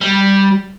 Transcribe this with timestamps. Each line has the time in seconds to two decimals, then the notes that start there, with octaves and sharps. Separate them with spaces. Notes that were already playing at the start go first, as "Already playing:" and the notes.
0.01 G3